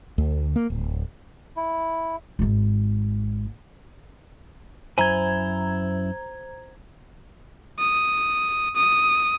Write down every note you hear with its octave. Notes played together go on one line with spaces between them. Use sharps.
D2
A#3
D1
E4
G#1 G#2
F#2 E4 C5 G#5 A#5 G#6
D#6
D#6